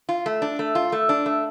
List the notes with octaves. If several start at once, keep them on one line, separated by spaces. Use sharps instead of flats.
F4
A3
D4
A3
F4
A3
D4
A3